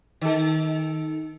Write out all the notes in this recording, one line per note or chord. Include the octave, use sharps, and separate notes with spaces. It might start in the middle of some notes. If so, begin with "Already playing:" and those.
D#3 A4